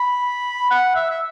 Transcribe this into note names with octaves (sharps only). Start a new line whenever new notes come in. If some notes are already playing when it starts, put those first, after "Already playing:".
Already playing: B5
F#5
E5
E5